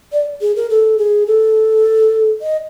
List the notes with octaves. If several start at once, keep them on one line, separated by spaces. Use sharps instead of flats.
D5
G#4
A#4
A4
G#4
A4
D#5